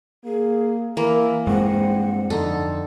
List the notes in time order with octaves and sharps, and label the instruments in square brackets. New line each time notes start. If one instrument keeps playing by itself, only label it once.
[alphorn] A#3 [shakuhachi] G#4
[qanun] E3 A#3 [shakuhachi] E4 [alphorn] A#4
[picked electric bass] G2 G#3 [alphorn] C4 [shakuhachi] F#5
[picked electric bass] F2 [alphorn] D3 [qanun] D#4 A4